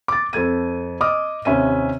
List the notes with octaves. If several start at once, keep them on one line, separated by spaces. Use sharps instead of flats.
D6 A6
F2 A4 G#6 D#7
D#5 D6 D#6 F6
D#2 C3 C#4 E5 D#7